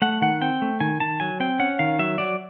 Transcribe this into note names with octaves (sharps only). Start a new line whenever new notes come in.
A3 F#5
D#3 F#5
C4 G5
A3
D#3 G#5
D#3 A5
F#3 G#5
C4 G5
C#4 F#5
D#3 F5
F#3 E5
F#3 D5